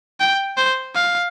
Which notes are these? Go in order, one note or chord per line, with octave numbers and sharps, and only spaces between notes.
G5
C5
F5